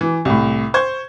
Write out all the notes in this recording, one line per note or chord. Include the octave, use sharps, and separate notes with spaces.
E3
C2 A2
C5 C#6 G6 G#6